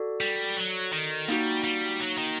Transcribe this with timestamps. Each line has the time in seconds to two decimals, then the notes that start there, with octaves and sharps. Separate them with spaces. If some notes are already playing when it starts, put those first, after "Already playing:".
Already playing: F#4 A4 D5
0.21 G3
0.56 F#3
0.93 D#3
1.28 G3 A#3 D#4 F#4
1.64 G3
2.00 F#3
2.18 D#3